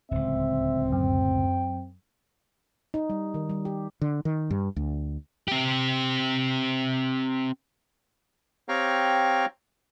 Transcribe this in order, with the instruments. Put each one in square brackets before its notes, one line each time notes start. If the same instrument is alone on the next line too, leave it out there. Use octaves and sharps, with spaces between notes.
[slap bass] D1 C#2 [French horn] C4 [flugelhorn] E5
[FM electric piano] F#2 [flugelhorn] G5
[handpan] D#4
G3
D#3
G3
G4
[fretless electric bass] D3
D#3
G2
D2
[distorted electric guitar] C4 G4
[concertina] C4 G4 C#5 F5 G5 A#5